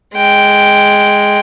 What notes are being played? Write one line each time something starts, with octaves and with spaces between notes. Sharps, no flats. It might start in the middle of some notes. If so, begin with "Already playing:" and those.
G#3 G5